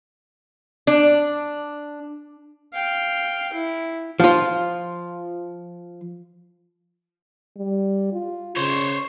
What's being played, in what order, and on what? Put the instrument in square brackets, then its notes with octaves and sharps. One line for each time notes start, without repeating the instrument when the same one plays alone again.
[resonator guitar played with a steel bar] D4
[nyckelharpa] F5 G5
E4
[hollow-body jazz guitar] F3 F4
[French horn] G3
F4
[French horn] C#3 [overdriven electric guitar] C5 C#5